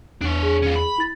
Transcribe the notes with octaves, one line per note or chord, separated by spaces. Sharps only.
E2 D4 C#5
G#4
C#4 F4
B5
E4 A6